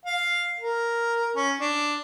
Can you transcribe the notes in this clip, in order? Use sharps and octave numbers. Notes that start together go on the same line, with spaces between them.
F5
A#4
C#4
D4